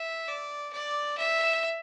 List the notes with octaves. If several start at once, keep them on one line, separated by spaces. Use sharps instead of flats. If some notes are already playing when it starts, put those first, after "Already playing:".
Already playing: E5
D5
D5
E5